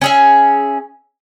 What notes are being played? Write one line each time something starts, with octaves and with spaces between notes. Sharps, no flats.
C#4 G#4 E5